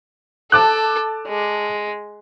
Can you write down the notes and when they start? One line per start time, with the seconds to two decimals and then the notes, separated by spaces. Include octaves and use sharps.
0.52 A4 A5 D6 F#6
1.27 G#3